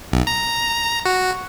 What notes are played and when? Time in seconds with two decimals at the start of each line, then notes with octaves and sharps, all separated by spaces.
0.12 B1
0.27 A#5
1.05 F#4